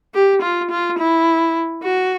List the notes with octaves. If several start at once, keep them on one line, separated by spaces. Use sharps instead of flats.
G4
F4
F4
E4
F#4